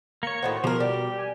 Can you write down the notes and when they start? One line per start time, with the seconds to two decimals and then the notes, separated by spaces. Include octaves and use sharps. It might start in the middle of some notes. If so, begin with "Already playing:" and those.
0.23 A#3 C#5 C#7
0.43 A2 D#3 F#4 C5
0.64 B2 F3 G4 A#4
0.80 G3 G4
1.18 G#5